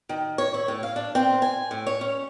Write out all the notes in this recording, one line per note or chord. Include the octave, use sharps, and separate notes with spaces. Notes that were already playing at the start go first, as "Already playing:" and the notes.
D#3
C#5
E4
A2
F5
D4
C4
G#5
A2
C#5
C#4